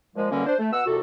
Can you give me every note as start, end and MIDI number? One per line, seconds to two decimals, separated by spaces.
0.15 0.28 46
0.15 0.28 53
0.15 0.28 56
0.29 0.45 42
0.29 0.45 47
0.29 0.45 50
0.29 0.45 55
0.29 0.45 58
0.29 0.45 61
0.45 0.53 62
0.45 0.53 72
0.58 0.71 57
0.71 0.80 47
0.71 0.80 78
0.71 0.80 88
0.86 1.00 36
0.86 1.00 41
0.86 1.00 48
0.86 1.00 66
0.86 1.00 69